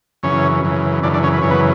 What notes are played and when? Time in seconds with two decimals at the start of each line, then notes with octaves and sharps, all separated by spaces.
0.23 F#2 C#3 E3 C#4 C#5
0.63 F#2 C#3 E3
1.03 F#2 C#3 E3 D4 D5
1.14 D4 D5
1.23 C#4 C#5
1.33 B4
1.42 F#2 C#3 E3 C#5
1.51 B3 B4